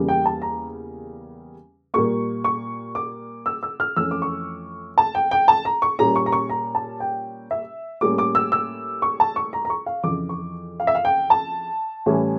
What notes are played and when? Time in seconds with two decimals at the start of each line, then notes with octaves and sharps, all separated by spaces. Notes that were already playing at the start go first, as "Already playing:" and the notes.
Already playing: E2 C#3 G3 A#3
0.08 G5
0.26 A5
0.42 A#5
1.94 A#2 G3 A#3 C#6
2.44 C#6
2.95 D6
3.46 E6
3.63 E6
3.80 F6
3.96 F2 E3 A3 C#4 E6
4.11 D6
4.22 C#6
4.98 A5
5.15 G5
5.31 G5
5.48 A5
5.65 A#5
5.82 C#6
5.99 A#2 G3 C#4 A#5
6.16 C#6
6.26 A#5
6.32 C#6
6.50 A#5
6.75 A5
7.00 G5
7.51 E5
8.01 A2 G3 A#3 C#4 D6
8.18 D6
8.35 E6
8.52 E6
9.02 C#6
9.20 A5
9.36 C#6
9.53 A#5
9.65 A#5
9.70 C#6
9.86 F5
10.04 F2 C#3 E3 D6
10.29 C#6
10.80 F5
10.87 E5
10.95 F5
11.05 G5
11.30 A5
12.06 A2 E3 G3 C#4